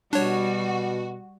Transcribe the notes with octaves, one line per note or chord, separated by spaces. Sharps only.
B2 G3 D4 F#4 C#5